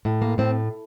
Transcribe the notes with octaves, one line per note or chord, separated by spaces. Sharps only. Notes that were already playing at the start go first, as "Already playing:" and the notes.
A2
A#3
A2 C4